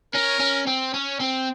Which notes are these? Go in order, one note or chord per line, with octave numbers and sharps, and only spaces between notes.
C#4 A#4
C#4
C4
C#4
C4